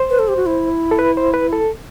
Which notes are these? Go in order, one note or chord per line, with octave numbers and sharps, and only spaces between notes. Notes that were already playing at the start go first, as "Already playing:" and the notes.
Already playing: C5
B4
A4
G4
F#4
E4
A4
B4
C5
B4
A4